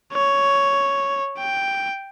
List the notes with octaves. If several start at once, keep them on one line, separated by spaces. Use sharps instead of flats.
C#5
G5